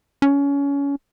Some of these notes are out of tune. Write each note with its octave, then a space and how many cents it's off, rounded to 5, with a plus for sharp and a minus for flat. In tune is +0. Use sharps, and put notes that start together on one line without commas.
C#4 +25